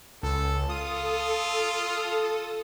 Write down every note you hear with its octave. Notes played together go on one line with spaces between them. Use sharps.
C#2 A4
F4 A4 D#6